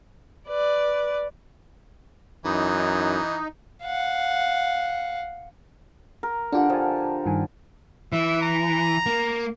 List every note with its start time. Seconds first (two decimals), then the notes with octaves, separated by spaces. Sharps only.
0.48 B4 D5
2.45 F#2 E3 D#4
3.85 F5 F#5
6.23 A#4
6.52 D3 D4 F4 G4 F#5
6.70 F3 G#5 A5
7.26 G2 D#3 G#5
8.12 E3 E5
8.42 A#5
9.06 A#3